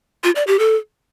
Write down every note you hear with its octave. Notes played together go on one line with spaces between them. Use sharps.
F4
D5
G4
A4